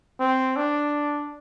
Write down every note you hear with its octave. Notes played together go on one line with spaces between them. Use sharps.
C4
D4